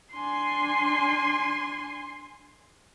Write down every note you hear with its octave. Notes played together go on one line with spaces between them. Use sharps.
D4 G#5 C6